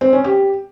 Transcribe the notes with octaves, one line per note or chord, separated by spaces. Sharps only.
C4
C#4
G4